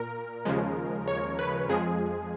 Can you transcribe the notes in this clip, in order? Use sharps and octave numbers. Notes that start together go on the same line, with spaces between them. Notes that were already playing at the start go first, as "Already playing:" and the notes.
Already playing: A#2 A#4
D#2 C#3 F3 G#3
C#5
B4
F2 F3 G#3 G#4